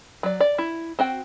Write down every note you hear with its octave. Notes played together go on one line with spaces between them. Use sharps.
F#3 D5
D5
E4
C4 F#4 G5